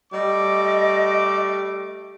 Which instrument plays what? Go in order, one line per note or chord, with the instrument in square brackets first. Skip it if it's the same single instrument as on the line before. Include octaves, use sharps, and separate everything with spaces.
[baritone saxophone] G3 [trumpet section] A3 D6 [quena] D#5